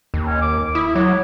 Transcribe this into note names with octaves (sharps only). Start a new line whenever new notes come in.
D#2
C#4
D6
E4 D#6
F#3 C#5